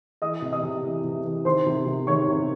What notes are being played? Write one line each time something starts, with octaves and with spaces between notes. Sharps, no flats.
E3 D#5 D#6
C3
D#5 D#6
C3
E3
C3
E3
D#3 C5 C6
C3
C3
D#3 C#5 C#6
C3